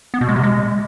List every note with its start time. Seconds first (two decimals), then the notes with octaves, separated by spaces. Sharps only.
0.14 B3
0.21 B2
0.29 G#3
0.36 C3
0.43 G#3